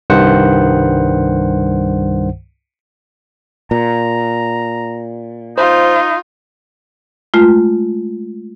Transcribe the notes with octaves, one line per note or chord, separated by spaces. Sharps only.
C2 G2 D#3 C5 F#5
A#2 A#5
D#4 F4 C5
G#3 A3 F4